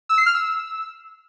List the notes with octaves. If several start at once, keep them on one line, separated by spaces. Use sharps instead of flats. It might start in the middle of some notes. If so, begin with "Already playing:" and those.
E6
C7
F6
E6